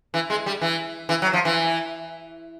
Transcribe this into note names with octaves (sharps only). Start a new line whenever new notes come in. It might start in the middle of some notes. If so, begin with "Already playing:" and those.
E3
G#3
G3
E3
E3
F#3
F3
E3